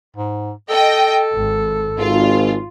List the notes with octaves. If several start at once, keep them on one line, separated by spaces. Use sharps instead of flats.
G#2
A4 D#5 G5
G#1
G#1 F4